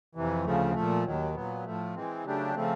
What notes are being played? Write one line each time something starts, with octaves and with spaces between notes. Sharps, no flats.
F2 C3 E3
D2 C#3 F3 A3
A#2 F3 A3
D#2 D#3 F#3
A#2 F#3 B3
A2 F3 A3
E3 G#3 C4
C#3 F#3 A3 D4 G4
C#3 F3 A3 C4